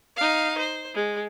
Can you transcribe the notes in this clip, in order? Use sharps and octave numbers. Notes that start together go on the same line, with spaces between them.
D#4 F5
C5
G#3